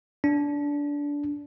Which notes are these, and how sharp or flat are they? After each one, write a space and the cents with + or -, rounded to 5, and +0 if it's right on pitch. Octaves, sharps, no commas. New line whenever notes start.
D4 -20